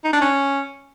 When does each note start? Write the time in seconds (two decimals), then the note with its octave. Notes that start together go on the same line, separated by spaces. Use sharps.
0.04 D#4
0.13 D4
0.21 C#4